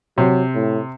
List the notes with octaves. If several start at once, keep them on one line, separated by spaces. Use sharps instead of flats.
C3 F#3
A2